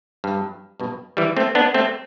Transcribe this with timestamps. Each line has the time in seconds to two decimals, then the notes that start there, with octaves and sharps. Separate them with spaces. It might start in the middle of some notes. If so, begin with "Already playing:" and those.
0.24 G2
0.80 G2 B2
1.17 E3 G3
1.37 A3 C4
1.55 B3 D4
1.74 A3 C4